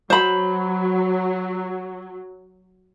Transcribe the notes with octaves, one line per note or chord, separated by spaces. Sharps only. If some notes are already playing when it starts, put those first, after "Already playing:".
F#3 C5 B5